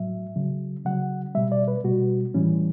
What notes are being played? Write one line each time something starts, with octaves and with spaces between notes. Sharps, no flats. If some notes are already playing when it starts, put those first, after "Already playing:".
Already playing: A2 F#3 E5
C#3 F#3
C#3 F#3 F#5
B2 G3 E5
D5
B4
B2 G3 F#4
A2 E3 G3 C#4